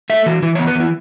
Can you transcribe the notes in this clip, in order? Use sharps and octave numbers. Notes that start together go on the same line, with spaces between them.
A3 E5
E3 F#4
E3 E4
B3 C#5
B4
E3 E4